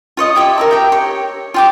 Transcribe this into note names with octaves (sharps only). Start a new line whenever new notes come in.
F4 C#5 D#5 D#6
E4 G4 C#5 E5
A#4 E5 A#5
G4 G5
C#5
F4 G5 D6